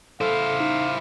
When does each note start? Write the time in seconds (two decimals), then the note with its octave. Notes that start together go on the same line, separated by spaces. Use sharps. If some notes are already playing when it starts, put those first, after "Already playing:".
0.21 E4 A4 C5 F5
0.60 D#4